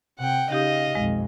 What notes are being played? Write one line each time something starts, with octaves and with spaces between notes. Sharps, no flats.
C3 F#5 G5
C#3 D#4 G4 D#5 F5 D#6
B1 F2 G#3